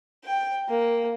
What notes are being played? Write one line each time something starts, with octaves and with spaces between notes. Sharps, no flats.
G5
A#3